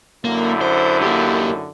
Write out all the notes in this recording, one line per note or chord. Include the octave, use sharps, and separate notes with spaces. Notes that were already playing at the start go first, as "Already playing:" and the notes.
F#2 D3 A#3 E4
C5
A#3 G4